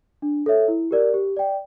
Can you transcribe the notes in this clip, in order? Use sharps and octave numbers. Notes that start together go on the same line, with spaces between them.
D4
A4 C#5 E5
E4
G4 A#4 D5
G4
D5 G5